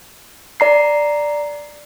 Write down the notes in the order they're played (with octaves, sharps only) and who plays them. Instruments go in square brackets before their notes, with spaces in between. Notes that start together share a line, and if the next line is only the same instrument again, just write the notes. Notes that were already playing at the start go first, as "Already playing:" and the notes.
[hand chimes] D5 A#5 C7